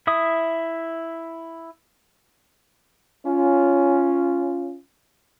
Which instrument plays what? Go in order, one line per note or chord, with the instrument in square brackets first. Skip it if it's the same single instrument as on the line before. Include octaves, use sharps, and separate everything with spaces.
[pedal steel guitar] E4 E5 D#6
[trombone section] C#4 F4